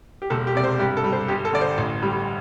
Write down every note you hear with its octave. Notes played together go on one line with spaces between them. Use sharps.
G4
E1 A4
G4
C3 D5
C5
G2 G4
A4
G3
C5
G1 G4
A4
D3 D5
C5
A1
G3